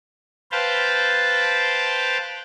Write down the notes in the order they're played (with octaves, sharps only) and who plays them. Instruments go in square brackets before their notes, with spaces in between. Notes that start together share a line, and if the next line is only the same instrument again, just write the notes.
[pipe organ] B4 C5 F5 G5 A5